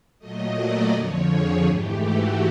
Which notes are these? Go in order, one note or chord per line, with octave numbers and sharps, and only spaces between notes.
A#2 F#3 A3 D#5
D5
F2 D3 F3 C#5
G#4
G#2 E3 A3 G4
F#4